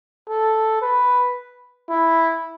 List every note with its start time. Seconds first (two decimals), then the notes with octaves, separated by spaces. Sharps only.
0.29 A4
0.82 B4
1.89 E4